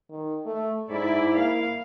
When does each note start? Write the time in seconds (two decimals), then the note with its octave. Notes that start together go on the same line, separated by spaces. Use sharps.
0.10 D#3
0.46 A3
0.90 G#2 E4 D5
1.36 A#3 F5